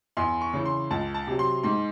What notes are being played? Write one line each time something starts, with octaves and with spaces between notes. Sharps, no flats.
E2 C6
C#6
C#3 E3
C6
C#2 A5
A5
C3 F#3
C6
G#2 C6